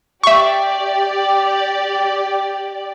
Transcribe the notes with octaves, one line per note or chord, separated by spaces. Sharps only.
G4 D5 E5 C#6